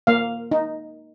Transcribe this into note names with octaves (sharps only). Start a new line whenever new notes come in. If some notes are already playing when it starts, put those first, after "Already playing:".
A#3 F5
D#4